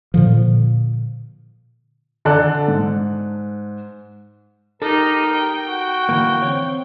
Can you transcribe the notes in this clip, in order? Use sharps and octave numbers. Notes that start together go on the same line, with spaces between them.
A#2 D3 F3
D3 A4 D5 F#6
G#2
D#4 G4 A4 A#4
G5
F#4
D3 E3 A#3
C4 C#5